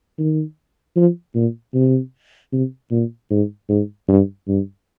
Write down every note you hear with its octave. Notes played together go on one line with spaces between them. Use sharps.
D#3
F3
A#2
C3
C3
A#2
G#2
G#2
G2
G2